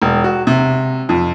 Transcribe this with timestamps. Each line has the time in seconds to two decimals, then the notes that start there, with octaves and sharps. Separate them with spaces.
0.02 E1
0.24 F#4
0.47 C3
1.09 F2